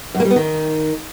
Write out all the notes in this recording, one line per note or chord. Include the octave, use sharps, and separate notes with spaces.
F#2
A#3
G3
B3
D#3